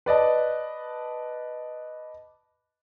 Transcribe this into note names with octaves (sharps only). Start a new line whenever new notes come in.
B4 D5 D#5 A5